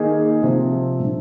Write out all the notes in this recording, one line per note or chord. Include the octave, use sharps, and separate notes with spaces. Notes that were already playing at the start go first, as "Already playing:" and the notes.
Already playing: D#3 A#3 D#4 G#4
C3 F3 C4
A#2 G3 D4